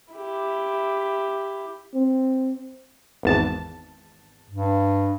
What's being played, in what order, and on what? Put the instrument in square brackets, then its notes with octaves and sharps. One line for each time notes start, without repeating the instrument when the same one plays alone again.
[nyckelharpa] E4 G4
[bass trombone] C4
[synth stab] G#1 E2 A5
[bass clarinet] G2